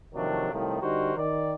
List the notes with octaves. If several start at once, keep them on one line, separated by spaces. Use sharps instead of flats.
C3 D#3 F3 F#3 A3 D4
C2 A2 C3 D#3 F3
D3 G3 D#4 F#4 A#4 C5
D#3 D5